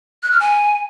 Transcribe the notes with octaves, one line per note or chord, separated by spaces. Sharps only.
F#6
F6
G#5